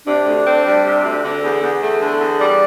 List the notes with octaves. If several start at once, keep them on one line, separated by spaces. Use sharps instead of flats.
C3 D4
D2
C4
G3
C3
D2
D3
E2
E2
A3
D3
E2
G3 D5